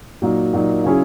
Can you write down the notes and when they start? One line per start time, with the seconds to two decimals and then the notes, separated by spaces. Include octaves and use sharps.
0.22 A#2 F#3 A#3 D#4
0.53 A#2 F#3 A#3 D#4
0.84 C#3 F#3 C#4 E4 G#4